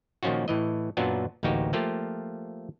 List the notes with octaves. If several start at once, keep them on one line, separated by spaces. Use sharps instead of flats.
A#2 D#3 F3 C#4 F4 F#4
A2 E3 D#5
F#2 A#2 F#3 B3 D4 F4
A1 D2 A#3 D#4 F#4 G4
F3 A3 A#3 F4 G4